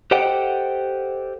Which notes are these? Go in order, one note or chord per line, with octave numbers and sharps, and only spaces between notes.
G4 A4 C5 D#5 F#5 G5